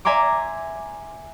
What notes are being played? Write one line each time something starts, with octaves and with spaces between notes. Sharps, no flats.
E5 G#5 A#5 C6 D6